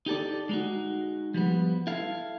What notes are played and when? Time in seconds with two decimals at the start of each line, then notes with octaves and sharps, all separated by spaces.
0.06 D#4 G4 A4 D5
0.49 G#3 D#4 F#4
1.34 F3 G3 B3
1.87 E4 A4 F5